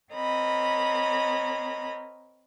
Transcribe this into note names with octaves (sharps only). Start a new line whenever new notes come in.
C4 A#4 C#5 D#5 B5